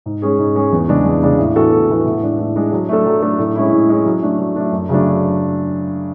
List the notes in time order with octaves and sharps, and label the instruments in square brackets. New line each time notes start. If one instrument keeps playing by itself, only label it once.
[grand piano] G#2
G#3 C#4 G#4
G#2
G#3 C#4 G#4
E2
C#3 G#3 D4
E2
C#3 G#3 D4
A2
E3 B3 F#4 A4
A2
E3 B3 F#4 A4
A2
G#3 D4
A2
G#3 D4
F#3
A3 D4 A4
F#3
A3 D4 A4
A2
G#3 C#4 E4
A2
G#3 C#4 E4
F#3
A3 D4
F#3
A3 D4
F#2
C#3 F#3 A3 D4